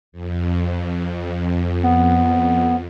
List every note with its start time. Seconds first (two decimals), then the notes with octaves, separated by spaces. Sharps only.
0.12 F2
1.83 B3